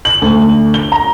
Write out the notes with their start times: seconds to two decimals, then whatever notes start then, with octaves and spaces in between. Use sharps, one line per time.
0.05 F#7
0.22 D2
0.74 G7
0.92 A#5